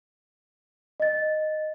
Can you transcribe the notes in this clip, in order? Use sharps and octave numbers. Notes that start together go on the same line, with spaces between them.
D#5 A6